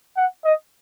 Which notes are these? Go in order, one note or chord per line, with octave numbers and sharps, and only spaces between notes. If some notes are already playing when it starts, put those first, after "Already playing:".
F#5
D#5